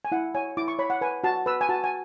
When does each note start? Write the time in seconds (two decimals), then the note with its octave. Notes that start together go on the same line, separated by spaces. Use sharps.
0.05 G#5
0.12 E4 F#5
0.35 C#5 G#5
0.57 E4 D6
0.68 C#6
0.79 C#5 B5
0.90 F#5
1.01 B4 G#5
1.24 F#4 A5
1.46 B4 E6
1.61 G#5
1.69 F#4 A5
1.84 G#5